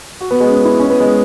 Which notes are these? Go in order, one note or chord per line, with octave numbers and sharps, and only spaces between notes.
F#4
B3
G#3
C#4
E4
C#4
B3
G#3